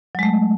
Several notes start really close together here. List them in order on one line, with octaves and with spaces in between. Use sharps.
F#3 G#3 A3